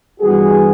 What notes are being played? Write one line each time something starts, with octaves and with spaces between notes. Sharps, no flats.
G2 E3 G3 B3 F#4 G#4